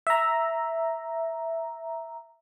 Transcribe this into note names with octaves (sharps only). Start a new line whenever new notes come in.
E5 A#5